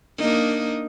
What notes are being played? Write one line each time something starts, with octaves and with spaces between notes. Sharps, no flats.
A#3 D4 D#4